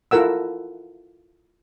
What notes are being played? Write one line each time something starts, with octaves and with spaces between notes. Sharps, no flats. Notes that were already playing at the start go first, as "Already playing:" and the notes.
E4 F4 A4 A#4 F#5 E6